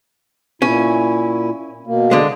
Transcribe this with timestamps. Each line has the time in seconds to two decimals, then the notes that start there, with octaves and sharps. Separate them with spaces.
0.62 A#2 C#4 E4
1.87 B2 A#3
2.11 D3 G#3